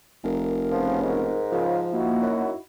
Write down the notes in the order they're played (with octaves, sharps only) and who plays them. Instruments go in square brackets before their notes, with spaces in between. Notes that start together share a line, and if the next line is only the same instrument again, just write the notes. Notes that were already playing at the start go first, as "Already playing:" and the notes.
[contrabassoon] F1 [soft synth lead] A#4
[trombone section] C#3 B3 C#4 [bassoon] F3
[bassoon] G#2
[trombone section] C#3 F4 [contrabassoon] F3
[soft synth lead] A#3 [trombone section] D#4 E4 F#4
[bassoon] F#2